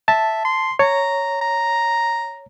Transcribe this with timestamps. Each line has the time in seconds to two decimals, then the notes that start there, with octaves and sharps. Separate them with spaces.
0.08 E5 A5
0.45 C6
0.79 C#5 A#5
1.41 A#5